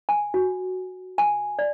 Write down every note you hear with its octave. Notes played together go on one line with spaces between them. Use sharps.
G#5
F#4
G#5
D5